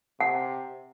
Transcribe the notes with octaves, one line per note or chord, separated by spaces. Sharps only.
C3 F#5